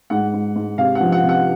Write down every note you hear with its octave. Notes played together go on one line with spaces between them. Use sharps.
G#2 F#5
G#2
G#2
C3 F5
F#5
F3
F#5
C3
F#5